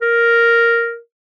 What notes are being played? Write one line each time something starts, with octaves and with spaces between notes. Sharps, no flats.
A#4